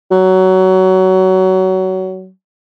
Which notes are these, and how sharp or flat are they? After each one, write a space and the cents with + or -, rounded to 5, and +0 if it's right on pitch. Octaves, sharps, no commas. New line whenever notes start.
F#3 +20